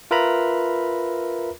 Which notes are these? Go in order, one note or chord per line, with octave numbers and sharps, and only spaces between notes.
F4 A#4 B4 E5 A#5 B5